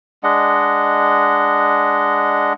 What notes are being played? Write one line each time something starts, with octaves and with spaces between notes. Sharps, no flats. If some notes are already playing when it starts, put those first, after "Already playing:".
G#3 D4 D#5 F#5